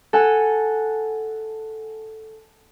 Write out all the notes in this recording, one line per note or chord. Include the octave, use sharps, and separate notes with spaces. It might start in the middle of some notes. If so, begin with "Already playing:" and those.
A4 F#5 G#5